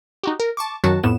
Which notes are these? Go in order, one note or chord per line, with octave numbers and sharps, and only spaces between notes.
D#4 F#4 G4
A#4
A5 C#6 D6
F#2 D#3 F#3 F#4 A5
F2 A2 B3 E7